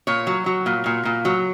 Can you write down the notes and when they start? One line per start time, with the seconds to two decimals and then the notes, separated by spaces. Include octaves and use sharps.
0.07 A#2 C#5
0.27 F#3
0.46 F#3
0.66 A#2
0.86 A#2
1.05 A#2
1.25 F#3